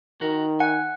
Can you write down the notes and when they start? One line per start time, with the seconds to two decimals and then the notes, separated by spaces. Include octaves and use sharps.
0.21 D#3 F#4 A#4
0.60 F#5 G#5